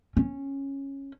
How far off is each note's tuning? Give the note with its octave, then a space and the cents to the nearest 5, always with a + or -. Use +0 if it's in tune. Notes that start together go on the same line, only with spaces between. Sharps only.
C#4 -10